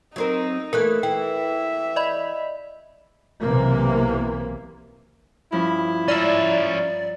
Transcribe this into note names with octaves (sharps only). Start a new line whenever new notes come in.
F#3 C4 D#4 A#4
E3 A3 A#3 A#4 F#6
E3 E5 G5
D5 D#5 B5
B1 C3 E3 A#3
G2 F3 C#4 E4
C#4 D5 E5 A#5